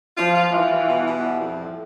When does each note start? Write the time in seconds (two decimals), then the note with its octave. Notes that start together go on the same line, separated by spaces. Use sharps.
0.18 F3 F4
0.35 F4
0.53 E3 F4
0.71 G3
0.88 B2
1.06 B2
1.24 G3
1.41 F2
1.59 A2